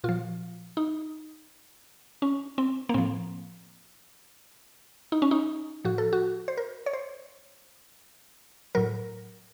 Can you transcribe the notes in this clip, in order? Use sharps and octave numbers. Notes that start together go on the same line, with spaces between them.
A#2 F3 F4
D#4
C#4
C4
A#3
A2 F3 C4
D#4
C#4
D#4
A2 F3 F#4
A4
F#4
C5
A#4
C#5
C5
A2 F#3 A#4